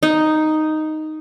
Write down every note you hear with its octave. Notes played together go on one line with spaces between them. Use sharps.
D#4